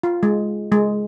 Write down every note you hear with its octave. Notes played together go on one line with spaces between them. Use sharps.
F4
G#3
G#3